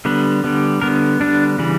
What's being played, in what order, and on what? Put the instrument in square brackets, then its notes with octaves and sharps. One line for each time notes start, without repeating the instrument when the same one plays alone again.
[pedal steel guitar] D3 G3 B3
D3 G3 B3
D3 G3 B3 A#4
D3 G3 B3 D4
C#3 E3 G3